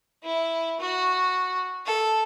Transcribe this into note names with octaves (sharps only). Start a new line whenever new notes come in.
E4
F#4
A4